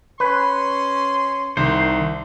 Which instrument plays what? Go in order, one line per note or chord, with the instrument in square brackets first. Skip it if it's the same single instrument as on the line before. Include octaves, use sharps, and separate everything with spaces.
[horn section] C#4 C6 [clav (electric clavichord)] B4
[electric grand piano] C2 [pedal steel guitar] D#3 C5